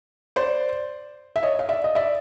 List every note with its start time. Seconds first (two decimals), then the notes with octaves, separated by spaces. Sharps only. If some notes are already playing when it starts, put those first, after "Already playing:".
0.36 C5 D5
1.36 E5
1.43 C#5 D#5
1.59 F5
1.69 D5 E5
1.84 D#5
1.95 D5 E5